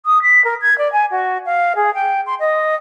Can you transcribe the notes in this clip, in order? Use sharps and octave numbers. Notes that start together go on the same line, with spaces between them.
D#6
B6
A#4
G#6
D5
G#5
F#4
F5
G#4
G5
C6
D#5